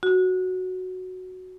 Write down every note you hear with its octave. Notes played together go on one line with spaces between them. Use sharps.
F#4